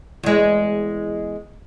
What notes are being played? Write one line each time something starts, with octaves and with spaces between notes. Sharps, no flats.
E2 G#3